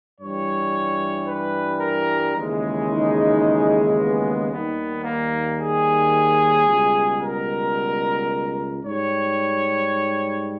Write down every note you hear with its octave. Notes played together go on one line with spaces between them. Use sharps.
G2 E3 G3 C#5
B4
A#4
D#2 C#3 E3 G#3
D#4
B3
D#2 D#3 G3 B3
A#3
G#4
C#2 B2 G3
A#4
G#2 G3 C#5